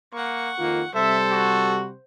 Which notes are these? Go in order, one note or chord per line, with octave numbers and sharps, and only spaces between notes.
A#3 F#5 C#6
F2 D#3 A#3 F4
C3 G3 A4 C5 E5
F#4